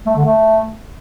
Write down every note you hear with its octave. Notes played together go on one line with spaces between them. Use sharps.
A3
D3
A3